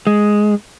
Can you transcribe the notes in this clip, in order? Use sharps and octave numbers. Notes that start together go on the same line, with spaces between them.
G#3